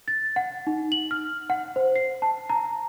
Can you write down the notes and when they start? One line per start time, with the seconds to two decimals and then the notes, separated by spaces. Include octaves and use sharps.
0.08 A6
0.36 F#5
0.67 D#4
0.92 F#7
1.11 F6
1.50 F#5
1.76 C5
1.96 C7
2.22 A5
2.50 A#5